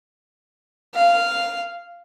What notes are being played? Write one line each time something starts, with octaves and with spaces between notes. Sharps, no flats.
F5